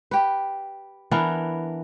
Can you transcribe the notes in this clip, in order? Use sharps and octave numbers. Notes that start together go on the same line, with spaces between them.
G4 B4
E3 B3 D4 A#4